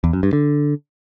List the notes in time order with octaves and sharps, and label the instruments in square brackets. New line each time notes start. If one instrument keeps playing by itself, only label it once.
[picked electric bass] E2
F#2
G2
D3